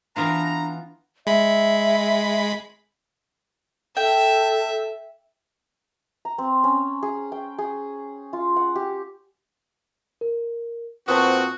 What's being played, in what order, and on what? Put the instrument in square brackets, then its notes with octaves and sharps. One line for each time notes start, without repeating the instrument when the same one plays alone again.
[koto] E3 B3 F4 [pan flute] D4 [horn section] A#5
[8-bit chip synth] G#3 B5 [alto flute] E5
[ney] A4 [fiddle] E5 [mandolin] G5
[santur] A#5
C4
C#4
G#4
G5
G#4
F4
F#5
G4
[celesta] A#4
[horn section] A#2 C4 F#4 [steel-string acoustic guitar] B4 C5 A5 [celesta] D#6